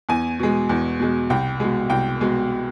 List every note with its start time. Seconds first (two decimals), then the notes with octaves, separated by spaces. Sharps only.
0.09 E2 G#5
0.39 B2 G#3
0.69 E2
1.00 B2 G#3
1.30 C2 G5
1.60 B2 G#3
1.90 C2 G5
2.21 B2 G#3